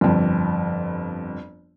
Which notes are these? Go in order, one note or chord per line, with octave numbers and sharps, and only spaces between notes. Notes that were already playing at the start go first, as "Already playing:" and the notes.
G1 F2